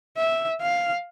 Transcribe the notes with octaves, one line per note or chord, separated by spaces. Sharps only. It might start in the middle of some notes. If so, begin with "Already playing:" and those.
E5
F5